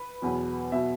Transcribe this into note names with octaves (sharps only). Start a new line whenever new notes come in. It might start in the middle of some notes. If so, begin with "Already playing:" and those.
Already playing: B4
E2 B2 F#3
B2 F#3 E5